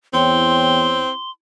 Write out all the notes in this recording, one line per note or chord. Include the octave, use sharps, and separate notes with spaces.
E2 C4 E4 C#5 G5 C6